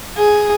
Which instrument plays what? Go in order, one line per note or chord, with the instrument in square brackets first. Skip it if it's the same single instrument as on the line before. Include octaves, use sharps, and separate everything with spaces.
[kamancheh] G#4